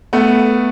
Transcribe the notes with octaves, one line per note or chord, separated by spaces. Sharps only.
A3 B3